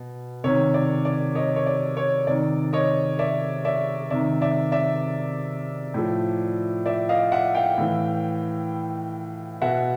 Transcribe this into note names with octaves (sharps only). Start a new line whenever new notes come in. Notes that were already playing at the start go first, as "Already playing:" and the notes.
Already playing: B2
C3 D#3 C#5
D5
D5
C#5 D#5
C#5
D5
C#5
C3 D#3 D5
C#5 D#5
D5 E5
D5 E5
C3 D#3 D5 E5
D5 E5
D5 E5
A2 F3
D5 E5
D#5 F5
E5 F#5
F5 G5
A2 E3
B2 E5 F#5